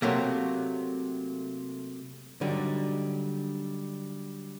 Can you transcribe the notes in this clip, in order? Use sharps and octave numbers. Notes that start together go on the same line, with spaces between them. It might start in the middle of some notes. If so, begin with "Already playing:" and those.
C3 F#3 A3 A#3
D3 F#3 G3 D#4